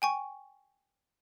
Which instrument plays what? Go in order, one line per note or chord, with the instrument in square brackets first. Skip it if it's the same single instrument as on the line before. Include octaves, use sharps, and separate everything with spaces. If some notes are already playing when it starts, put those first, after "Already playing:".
[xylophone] G5 G#5 C#6